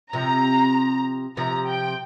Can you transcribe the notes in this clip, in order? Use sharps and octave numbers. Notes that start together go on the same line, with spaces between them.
C3 F3 A#5
C3 F3 A#5
G5